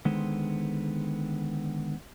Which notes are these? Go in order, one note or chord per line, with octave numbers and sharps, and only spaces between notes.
D3 D#3 G#3 B3 C5